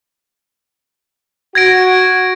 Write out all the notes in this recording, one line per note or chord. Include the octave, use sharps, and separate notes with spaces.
F#4 G#6 A#6 D7